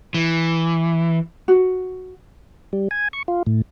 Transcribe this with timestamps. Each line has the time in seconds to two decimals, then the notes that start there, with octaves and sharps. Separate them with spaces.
0.14 E3
1.48 F#4
2.73 G3
2.91 G#5
3.13 C#6
3.28 F4
3.46 A2